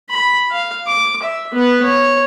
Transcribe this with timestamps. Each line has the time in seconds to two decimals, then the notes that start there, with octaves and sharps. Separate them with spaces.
0.10 B5
0.51 F5
0.87 D6
1.22 E5
1.53 B3 B4
1.83 C#5